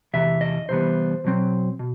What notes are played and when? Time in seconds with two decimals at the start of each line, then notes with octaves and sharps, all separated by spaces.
0.14 E2 C3 E3 E5
0.41 D#5
0.68 C2 C3 E3 G3 B3 C5
1.24 B2 F#3 C4
1.79 B2